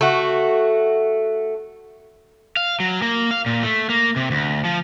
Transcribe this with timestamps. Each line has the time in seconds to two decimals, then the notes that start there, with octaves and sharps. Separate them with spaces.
0.01 A3 F#4
2.57 F5
2.80 F#3
3.02 A#3
3.31 F5
3.46 A#2
3.63 A3
3.89 A#3
4.16 C3
4.31 D2
4.65 F3